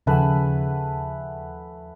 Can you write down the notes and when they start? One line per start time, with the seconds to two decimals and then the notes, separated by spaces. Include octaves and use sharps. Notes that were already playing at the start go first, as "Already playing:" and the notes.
0.07 D#2 C#3 F3 A3 B4 F#5 G#5